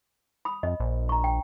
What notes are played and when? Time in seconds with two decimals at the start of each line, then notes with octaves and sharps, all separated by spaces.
0.45 B5 D#6
0.63 F2 D#5
0.80 A#1
1.09 A#5 C#6
1.24 G5